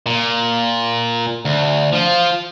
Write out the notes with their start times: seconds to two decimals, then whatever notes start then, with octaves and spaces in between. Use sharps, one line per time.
0.06 A#2
1.45 D2
1.93 F3 F4